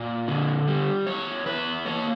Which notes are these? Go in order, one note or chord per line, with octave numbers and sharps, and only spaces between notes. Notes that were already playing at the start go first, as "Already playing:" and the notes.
Already playing: A#2 D5
D3
G3
E2 C#5
E2 B4
A#3 C#5